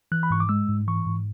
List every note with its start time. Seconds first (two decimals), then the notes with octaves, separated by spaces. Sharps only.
0.12 E3 F#6
0.23 B5
0.30 G#2 C#6
0.40 D6
0.49 G#3 E6
0.69 G#2
0.87 E3 C#6
1.06 G#2